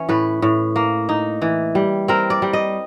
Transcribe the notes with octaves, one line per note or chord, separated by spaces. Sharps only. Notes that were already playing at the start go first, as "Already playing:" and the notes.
Already playing: E3 C#4
A2 B4
A2
A#3
D#4
E3
G3
C4 A#4
D5
G3
D#5